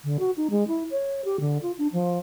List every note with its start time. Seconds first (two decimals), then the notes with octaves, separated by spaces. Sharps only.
0.04 D3
0.19 F#4
0.37 D#4
0.50 G#3
0.68 E4
0.91 C#5
1.25 G4
1.40 D3
1.62 F4
1.78 D4
1.93 F3